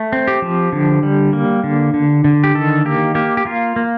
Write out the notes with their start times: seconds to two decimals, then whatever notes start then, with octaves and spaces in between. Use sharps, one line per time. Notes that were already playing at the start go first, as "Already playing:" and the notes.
Already playing: A3
0.13 C4
0.28 G4
0.42 F3
0.72 D3
1.03 G3
1.33 A#3
1.64 D3
1.94 D3
2.24 D3
2.44 G4
2.55 D#3 A4
2.85 A#3 G4
3.15 A#3 G4
3.37 G4
3.45 A#3 F4
3.76 A#3